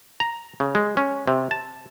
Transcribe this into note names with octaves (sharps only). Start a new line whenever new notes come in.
A#5
C#3
G#3
C#4
C3
A5